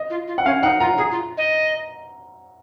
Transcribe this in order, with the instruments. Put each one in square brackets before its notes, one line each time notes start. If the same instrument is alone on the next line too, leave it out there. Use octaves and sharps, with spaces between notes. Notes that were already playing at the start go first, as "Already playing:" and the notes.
Already playing: [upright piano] D#5
[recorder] F4
F4
[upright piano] F#5
[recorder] C#4 [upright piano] F5
[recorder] D#4 [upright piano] F#5
[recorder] F4 [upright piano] A#5
[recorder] G#4 [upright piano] A#5
[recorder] F4
D#5